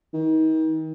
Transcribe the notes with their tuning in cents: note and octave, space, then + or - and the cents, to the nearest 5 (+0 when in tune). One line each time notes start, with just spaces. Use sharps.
D#3 +35